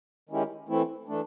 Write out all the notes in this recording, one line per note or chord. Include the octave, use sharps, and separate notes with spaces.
D#3 G#3 C#4 E4 G4
E3 A3 C4 E4
E3 A3 D4